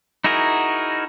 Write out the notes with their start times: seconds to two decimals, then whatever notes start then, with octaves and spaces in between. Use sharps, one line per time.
0.24 D#4 E4 F#4 G#4 A#4